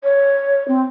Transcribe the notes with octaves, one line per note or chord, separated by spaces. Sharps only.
C#5
C4